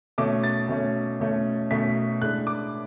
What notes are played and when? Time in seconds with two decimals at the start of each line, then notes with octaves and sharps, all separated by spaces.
0.18 B2 A3 C#4 D6
0.44 A6
0.69 B2 A3 C#4
1.20 B2 A3 C#4
1.71 B2 A3 C#4 B6
2.22 A2 G#3 D4 F#6
2.47 D6